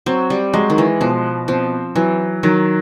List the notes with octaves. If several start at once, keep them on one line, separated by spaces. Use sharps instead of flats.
F#3 C4
G3
F#3 G#3
D#3
E3
B2 F3
F3 C4
E3 F#3
D#3 F#3